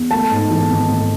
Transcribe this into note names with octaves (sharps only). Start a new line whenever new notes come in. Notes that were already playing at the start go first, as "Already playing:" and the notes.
Already playing: E2
A3 A5
G#2
E3
G#1
A3